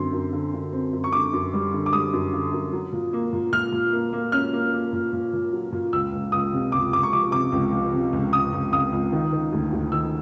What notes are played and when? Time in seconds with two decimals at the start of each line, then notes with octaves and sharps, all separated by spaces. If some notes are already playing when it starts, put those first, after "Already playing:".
Already playing: F#2 D3 C4 C6
0.13 F#2
0.33 D3
0.54 D3
0.73 C4
0.93 F#2
1.04 C#6
1.12 D3 D6
1.33 F#2
1.54 G3
1.72 D3
1.86 D6
1.93 G3 D#6
2.13 F#2
2.33 D3
2.53 F#2
2.73 F#3
2.93 A#2
3.13 A#3
3.33 A#2
3.53 A#2 F6
3.72 A#2
3.93 A#3
4.13 A#3
4.32 C#4 F6
4.53 A#3
4.73 A#3
4.93 A#2
5.13 A#2
5.33 A#2
5.53 F#3
5.72 A#2
5.93 C#2 E6
6.13 C#2
6.32 C#2 D#6
6.53 C3
6.72 C#2 D6
6.93 C#2 D6
7.03 C#6
7.13 F3 D6
7.32 C3 D6
7.52 C#2
7.73 F3
7.93 C3
8.13 C#2
8.33 C#2 D#6
8.52 C#2
8.72 C#2 D#6
8.92 C#2
9.12 D#3
9.32 D#3
9.52 D2
9.73 D2
9.92 D#3 E6